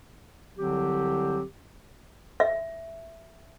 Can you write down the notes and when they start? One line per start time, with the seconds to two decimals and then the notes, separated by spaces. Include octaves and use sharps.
0.57 C2 D3 F#3 C4 G4
2.40 E5